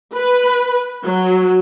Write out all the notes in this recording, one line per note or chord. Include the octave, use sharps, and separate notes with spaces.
B4
F#3